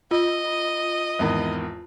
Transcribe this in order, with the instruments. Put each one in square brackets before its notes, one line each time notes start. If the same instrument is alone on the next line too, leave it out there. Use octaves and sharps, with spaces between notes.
[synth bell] F4 [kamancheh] D#5
[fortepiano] G#1 E2 D#3